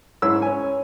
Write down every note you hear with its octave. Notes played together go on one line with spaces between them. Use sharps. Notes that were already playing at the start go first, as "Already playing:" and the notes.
G#2 C#4 E4 E6
C#4 G#5